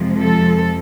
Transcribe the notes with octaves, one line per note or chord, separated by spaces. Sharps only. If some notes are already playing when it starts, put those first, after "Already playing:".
Already playing: F2 C3 F3 G#3
A4